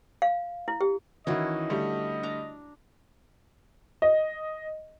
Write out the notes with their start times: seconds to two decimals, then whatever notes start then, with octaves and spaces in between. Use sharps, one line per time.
0.22 F5
0.68 E4
0.81 G4
1.27 D#3 E3 C#4 E4 F#4 D#5
1.69 D3 G3 A3
2.23 D4 A#5
4.02 D#5